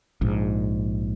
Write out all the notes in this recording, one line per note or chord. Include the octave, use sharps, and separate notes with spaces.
A#1 G#2